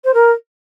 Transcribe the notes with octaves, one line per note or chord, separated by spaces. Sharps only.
C5
A#4